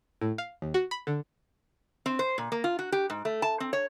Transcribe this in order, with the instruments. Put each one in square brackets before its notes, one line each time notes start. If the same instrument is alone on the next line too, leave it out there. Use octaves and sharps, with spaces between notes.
[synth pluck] A2
F5
D#2
F#4
B5
D3
[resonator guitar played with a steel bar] C4
C5
A#2
A#3
F4
F#4
G4
G#2
A3
A5
C4
C#5